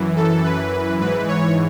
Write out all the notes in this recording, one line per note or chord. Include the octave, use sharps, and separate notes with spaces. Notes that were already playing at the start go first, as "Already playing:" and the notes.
Already playing: F#2 E3
A4
B4
G#2 E3 B4
C#5